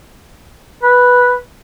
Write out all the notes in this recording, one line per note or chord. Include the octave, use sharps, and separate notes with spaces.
B4